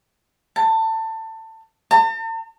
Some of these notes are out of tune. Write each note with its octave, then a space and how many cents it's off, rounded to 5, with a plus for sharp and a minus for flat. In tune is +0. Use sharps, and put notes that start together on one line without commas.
A5 +25
A5 +45